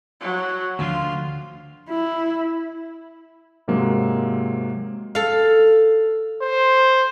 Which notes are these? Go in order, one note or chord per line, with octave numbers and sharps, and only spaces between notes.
F#3
D2 D3 F3 F4
E4
G#2 C3 F#3 G#3 A#3
A4 F5
C5